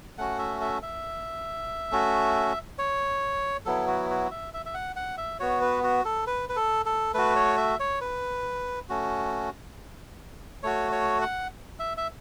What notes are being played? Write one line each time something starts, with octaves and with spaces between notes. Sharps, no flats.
A3 C#4 F#4 F#5
E5
E5
E5
A3 C#4 F#4
C#5
F#3 B3 E4 A4
F#4
F#4
E5
E5
E5
F#5
F#5
E5
B3 F#4 C#5
B4
F#4
A4
B4
B4
A4
A4
A3 F#4 B4
C#5
E5
C#5
B4
A3 C#4 F#4
A3 F#4 C#5
C#5
F#5
E5
E5